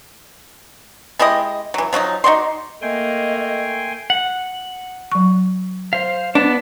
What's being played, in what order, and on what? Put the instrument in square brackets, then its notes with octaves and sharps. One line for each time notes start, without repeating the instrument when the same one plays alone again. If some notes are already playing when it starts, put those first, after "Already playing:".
[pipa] G#3 E4 G4 D#5
E3 F#3
F3 F#3 C#4 D#4
D#4 F#4 D5 C6
[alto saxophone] A3 [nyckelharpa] A#3 [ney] D#5 [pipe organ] G5 G#5 C6
[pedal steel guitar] F#5
[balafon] F#3 C#6
[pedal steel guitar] C5 F5
[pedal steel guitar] B3 [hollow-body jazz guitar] D4